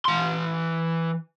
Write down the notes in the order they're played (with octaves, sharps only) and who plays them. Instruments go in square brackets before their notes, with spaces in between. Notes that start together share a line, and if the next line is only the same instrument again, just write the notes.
[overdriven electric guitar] E3 C6